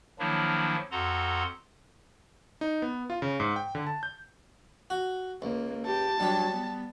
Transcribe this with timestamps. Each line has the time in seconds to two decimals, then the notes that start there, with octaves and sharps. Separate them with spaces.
0.19 D#3 F3 F#3 A#3 D4 E4
0.91 F2 F#4 A4 F#5 A#5 C6
2.61 D#4
2.82 B3
3.10 F4
3.22 C#3
3.40 G#2
3.56 G5
3.75 D3
3.87 A5
4.03 G6
4.90 F#4
5.42 C#2 A#3
5.86 G4 A5
6.20 F#3 G3 D4 G4
6.51 B3